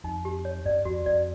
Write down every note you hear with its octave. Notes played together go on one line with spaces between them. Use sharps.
F2 D#4
G4
C#5
F#2 D5
F2 F#4
F2 D5